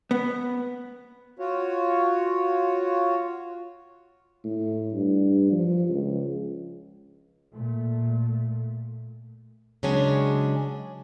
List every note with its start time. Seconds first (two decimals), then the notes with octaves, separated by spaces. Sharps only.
0.11 B3
1.39 F4 F#4 C#5
4.44 A2
4.93 G2
5.52 F3
5.89 C#2
7.54 A#2 A3
9.83 C#3 F#3 G#3 C#4 D4